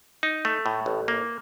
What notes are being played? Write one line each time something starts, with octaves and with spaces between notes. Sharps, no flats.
D#4
A3
A2
A1
A#3